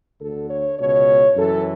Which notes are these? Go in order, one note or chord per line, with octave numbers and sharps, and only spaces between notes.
D2 D3 A4
C#5
C#2 B2 C#5
F#2 E3 A4